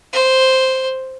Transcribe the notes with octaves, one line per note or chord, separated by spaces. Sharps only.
C5